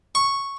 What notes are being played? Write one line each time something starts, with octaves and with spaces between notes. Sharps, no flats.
C#6